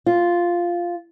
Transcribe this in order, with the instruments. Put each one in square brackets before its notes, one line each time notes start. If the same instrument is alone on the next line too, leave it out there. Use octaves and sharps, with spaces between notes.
[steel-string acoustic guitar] F4